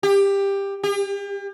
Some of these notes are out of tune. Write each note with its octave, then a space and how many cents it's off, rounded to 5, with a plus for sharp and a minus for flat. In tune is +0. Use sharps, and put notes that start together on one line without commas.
G4 +15
G4 +40